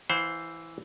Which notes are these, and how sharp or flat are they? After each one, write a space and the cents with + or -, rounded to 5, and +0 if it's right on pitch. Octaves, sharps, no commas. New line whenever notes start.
E3 +0 C5 +0 F5 +45